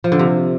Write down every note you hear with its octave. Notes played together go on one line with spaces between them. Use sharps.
F3
D3
C3